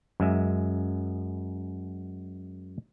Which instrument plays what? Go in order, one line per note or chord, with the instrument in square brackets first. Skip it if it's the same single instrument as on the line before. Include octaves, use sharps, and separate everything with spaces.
[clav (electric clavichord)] F#2 G#3 E5